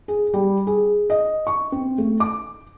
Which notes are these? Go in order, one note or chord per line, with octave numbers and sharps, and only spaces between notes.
G#4
G3
G#4
D#5
C#6
C4
A3
D6